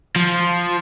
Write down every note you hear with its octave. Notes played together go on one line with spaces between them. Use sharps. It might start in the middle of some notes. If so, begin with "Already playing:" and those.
F3